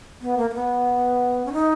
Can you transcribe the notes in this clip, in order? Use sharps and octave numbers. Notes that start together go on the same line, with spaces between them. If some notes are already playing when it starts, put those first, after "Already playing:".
B3
A#3
A#3
B3
C#4
D#4